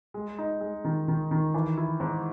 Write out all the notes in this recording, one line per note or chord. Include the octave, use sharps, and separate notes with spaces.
G#3
D#4
G#3
D#3
D#3
D#3
E3
E4
G#2